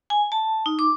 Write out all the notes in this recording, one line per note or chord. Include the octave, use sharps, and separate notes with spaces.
G#5
A5
D#4
D6